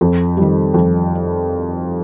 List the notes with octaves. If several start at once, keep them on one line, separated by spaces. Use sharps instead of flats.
F2
D#3 G3
F2